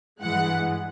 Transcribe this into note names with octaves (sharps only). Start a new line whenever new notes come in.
G2 E3 G#3 F#5